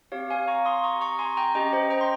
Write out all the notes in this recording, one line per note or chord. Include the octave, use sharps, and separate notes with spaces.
C4 G4 C#5 F5
F5 G#5
A#5 C#6
C6 D#6
A#5 C#6
A#5 C#6
G#5 C6
G5 A#5
C#4 G4 D#5 G5
C5 D#5
G5 A#5
C6